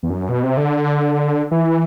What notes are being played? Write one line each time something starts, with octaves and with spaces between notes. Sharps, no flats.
E2
F#2
B2
C3
D3
E3